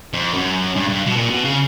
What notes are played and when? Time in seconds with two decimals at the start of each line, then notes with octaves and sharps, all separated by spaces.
0.14 F2
0.34 F#2
0.76 G2
0.89 G2
1.06 B2
1.16 A#2
1.30 B2
1.44 C#3